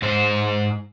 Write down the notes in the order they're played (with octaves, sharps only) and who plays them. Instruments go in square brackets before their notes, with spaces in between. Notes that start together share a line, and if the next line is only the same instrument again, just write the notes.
[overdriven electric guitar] G#2 C5